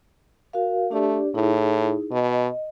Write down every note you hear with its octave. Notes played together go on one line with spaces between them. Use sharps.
F#4 A#4 F5
A3 D4 G4 D5
A2 D#4 E4 G#4
B2 D#5